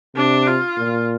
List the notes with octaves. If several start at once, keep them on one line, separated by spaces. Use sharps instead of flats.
C3 D4
F4
A#2